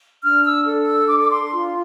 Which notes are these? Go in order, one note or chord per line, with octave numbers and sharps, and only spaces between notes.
D4 F6
E6
A4
E6
D4 D6
D6
C6
F4